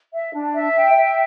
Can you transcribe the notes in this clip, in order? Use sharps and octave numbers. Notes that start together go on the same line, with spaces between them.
E5
D4
E5
G5
E5